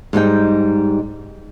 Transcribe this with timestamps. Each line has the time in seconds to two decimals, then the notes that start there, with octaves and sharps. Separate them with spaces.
0.13 G#2 G3 D#4 G5